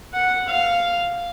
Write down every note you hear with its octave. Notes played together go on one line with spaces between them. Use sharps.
F#5
F5